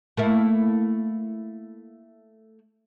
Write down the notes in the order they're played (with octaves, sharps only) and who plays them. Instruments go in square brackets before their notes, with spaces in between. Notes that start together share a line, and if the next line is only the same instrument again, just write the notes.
[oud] A3 A#3 E4